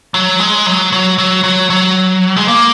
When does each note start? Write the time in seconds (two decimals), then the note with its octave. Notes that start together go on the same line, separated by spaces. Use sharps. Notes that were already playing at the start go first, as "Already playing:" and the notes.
0.14 F#3
0.40 G#3
0.66 F#3
0.92 F#3
1.18 F#3
1.44 F#3
1.70 F#3
2.36 G#3
2.48 A#3